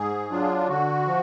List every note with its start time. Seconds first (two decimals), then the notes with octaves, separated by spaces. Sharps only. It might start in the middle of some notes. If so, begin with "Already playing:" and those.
Already playing: G#2 G#4
0.31 F#3 D4 F4
0.68 D3 F#4
1.07 F3